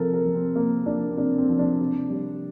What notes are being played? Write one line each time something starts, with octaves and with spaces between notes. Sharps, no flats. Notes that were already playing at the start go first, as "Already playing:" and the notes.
Already playing: C3 F3 A4 A#4
A#4
F3
C4
C3 A#3
F3 D4
C4
C3 D4
C4
F3
D4
C3
G3